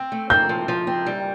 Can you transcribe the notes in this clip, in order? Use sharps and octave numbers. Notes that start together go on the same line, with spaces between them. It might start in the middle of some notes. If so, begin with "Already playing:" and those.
Already playing: C4
A3
C4 G6
F3
F3
C4
G3